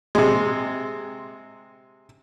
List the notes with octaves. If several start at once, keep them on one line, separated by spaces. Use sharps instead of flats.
C3 G#3